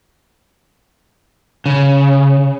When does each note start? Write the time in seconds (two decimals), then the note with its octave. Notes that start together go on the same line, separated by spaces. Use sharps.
1.66 C#3